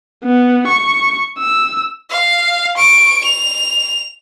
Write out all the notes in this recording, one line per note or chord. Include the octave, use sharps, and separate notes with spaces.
B3
C#6
E6
F5
C#6 D7
F7